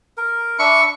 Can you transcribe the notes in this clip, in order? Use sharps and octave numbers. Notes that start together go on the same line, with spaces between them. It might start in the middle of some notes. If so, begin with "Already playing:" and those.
A#4
D4 E5 B5 C#6